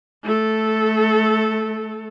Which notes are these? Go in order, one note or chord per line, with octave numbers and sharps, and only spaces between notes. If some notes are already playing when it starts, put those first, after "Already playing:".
A3 A4